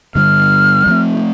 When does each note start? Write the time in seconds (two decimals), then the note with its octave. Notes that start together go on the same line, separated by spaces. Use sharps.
0.15 G2 D3 G3 F6
0.86 G2 F3 A3 C4